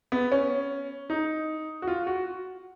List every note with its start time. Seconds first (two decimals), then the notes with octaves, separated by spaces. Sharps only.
0.12 B3
0.32 C#4
1.10 D#4
1.82 F#4
1.88 F4
2.07 F#4